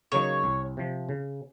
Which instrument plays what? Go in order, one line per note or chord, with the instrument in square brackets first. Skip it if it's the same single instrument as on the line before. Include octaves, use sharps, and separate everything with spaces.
[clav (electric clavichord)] C#3 F#3 A#3 D#4 [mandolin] C#5
[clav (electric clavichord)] C2
C3 F3
C#3